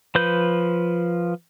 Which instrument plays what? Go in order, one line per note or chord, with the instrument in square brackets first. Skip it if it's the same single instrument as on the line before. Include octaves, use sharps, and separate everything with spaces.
[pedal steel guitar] F3 B4 G6